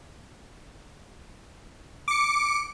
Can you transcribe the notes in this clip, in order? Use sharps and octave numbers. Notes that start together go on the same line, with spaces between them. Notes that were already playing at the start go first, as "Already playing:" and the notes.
D6 C#7